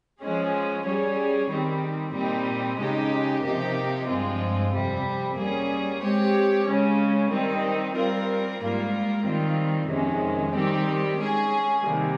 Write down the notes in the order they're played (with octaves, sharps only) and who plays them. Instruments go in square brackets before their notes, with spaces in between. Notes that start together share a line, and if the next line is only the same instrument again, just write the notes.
[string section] F3 G#3 C#4 G#4
G3 C#4 G#4 C#5
D#3 G3 C4
A#2 G3 C4 D#4
C#3 G#3 D#4 G4
C3 F3 A#3 D#4 G4
G2 F3 G#3 C4 F4
F2 C3 G3
G3 A#3 C#4 G#4
G#3 C4 G4 C#5
C#3 G#3 C#4
D#3 G3 C4 D#4
G3 C4 F4 A#4
G#2 G3 A#3 F4 A#4
D#3 G3 C4 F4
F2 C3 D#3 G#3 C#4
D#3 G3 C4 G4
G#3 C#4 G#4
C3 D#3 G3 A#3